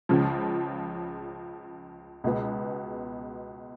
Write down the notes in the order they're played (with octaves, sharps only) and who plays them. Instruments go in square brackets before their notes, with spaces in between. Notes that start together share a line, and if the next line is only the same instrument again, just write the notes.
[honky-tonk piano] C#2 C#3 F3
C#2 B2 G#3 B3